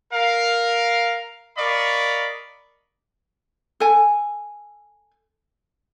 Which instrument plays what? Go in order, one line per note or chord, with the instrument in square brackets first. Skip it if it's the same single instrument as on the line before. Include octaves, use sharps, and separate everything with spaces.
[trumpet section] A#4 F5
A#4 D5 D#5 F5 B5 C#6
[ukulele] A4 G#5